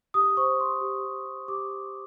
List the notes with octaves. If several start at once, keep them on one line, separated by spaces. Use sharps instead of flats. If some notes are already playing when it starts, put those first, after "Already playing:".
G4 D#6
C5 C#6
C5 C6
G4
G4
G4
G4 D6
G4